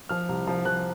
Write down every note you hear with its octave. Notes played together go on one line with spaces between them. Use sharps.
F3 F6
C2
F3
F3 F#6